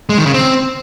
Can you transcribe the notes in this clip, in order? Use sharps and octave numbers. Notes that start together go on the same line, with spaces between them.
G#3
D#3
C#3
C4